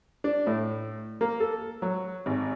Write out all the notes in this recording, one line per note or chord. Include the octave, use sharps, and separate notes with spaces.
D4
A2
A#3
A4
F#3
G#1